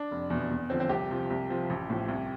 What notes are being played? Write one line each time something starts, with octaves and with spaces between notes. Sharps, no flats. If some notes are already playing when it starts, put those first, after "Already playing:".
Already playing: D4
F1
E2 B2
E2
D3 F3 C4
C4
C2 G4
C3 F3
C2
C3 F3
A1
A2 F3
C2